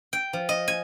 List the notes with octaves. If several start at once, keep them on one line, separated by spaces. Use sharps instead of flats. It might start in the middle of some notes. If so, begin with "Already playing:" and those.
G5
F3
D#5
G#5